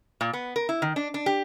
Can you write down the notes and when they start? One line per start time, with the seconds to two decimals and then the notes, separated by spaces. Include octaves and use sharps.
0.21 A#2
0.33 B3
0.56 A#4
0.69 E4
0.82 D#3
0.96 D4
1.14 D4
1.26 G4